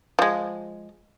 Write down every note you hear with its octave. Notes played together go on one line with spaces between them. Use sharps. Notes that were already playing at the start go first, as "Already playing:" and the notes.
F3 G#3